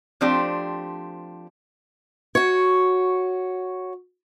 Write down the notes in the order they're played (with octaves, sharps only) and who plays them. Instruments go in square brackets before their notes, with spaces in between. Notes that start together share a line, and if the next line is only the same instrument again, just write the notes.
[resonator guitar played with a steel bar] F3 A3 C4 D4 G4
[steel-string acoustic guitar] F#4 C#5